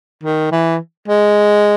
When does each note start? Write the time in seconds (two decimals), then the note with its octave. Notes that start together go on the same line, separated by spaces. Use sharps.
0.23 D#3
0.52 E3
1.08 G#3